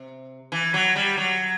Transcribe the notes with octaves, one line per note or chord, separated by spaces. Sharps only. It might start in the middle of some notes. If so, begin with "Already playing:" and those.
Already playing: C3
E3
F#3
G3
F#3